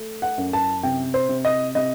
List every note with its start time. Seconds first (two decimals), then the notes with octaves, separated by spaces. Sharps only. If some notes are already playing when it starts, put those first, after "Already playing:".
Already playing: A3
0.22 F#5
0.38 F#2
0.53 A5
0.83 C3 G5
1.14 C5
1.29 C3
1.45 D#5
1.75 C3 D#5